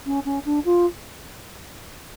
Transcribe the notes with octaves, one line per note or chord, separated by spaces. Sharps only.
C#4
C#4
D4
F4